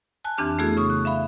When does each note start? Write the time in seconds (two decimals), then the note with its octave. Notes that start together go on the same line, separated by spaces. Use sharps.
0.24 G#5 A5 F#6
0.38 F2 E3 C4 D4 G4 F6
0.59 A3 B3 E4 F#4 G#4 A4
0.77 C#3 C#6 D#6
0.90 F#6
1.05 E5 F5 B5